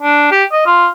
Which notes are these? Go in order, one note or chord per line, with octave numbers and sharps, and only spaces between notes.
D4
G4
D#5
F4